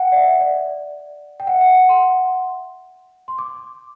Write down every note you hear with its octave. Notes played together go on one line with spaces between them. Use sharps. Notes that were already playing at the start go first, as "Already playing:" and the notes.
Already playing: F#5 G5
D5
E5
D5
G5
F#5
E5
F#5
C6
C6
D6